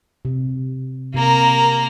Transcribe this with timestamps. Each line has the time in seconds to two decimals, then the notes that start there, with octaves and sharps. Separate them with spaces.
0.25 C3
1.15 C3 A#3 A#4